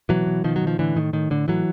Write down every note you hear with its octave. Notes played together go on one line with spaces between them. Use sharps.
B2 E3 F#3
B2
B2 D#3 F3
F#3
B2
F3
A2 D3 E3
A2 D#3
A2 D#3
A2 D3
A2 E3 F#3